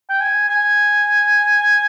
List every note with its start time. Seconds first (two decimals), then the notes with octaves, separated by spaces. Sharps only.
0.10 G5
0.21 G#5
0.49 G#5